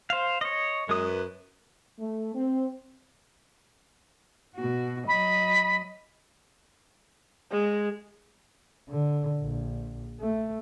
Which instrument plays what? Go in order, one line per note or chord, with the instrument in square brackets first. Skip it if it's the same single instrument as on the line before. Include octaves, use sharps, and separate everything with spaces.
[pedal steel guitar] C5 F5
C#5 D#5
[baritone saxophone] F#2 [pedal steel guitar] G#3 D#6
[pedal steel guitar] B4
[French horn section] A3
C4
[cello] B2 F#4
[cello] F#3 D#5 [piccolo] B5
[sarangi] G#3
[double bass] D3
A#1
A3